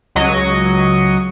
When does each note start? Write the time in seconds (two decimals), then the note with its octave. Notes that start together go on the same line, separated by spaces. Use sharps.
0.15 C#2 F#3 D#5 C#6 C#7